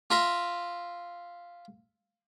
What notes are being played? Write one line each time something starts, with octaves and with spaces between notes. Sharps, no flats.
F4 E5 A#5